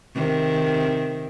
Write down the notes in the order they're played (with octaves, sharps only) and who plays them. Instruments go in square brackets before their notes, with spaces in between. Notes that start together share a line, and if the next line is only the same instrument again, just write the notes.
[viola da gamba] C3 D#3